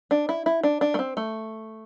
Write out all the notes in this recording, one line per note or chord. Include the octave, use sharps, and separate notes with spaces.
D4
E4
E4
D4
D4
A3
C4
A3